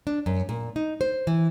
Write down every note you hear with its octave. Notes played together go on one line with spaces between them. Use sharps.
D4
F#2
A#2
D#4
C5
E3